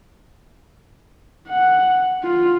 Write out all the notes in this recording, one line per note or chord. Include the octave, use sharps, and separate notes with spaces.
F#5
F4